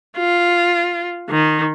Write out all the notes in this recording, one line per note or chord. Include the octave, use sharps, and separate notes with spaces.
F4
D#3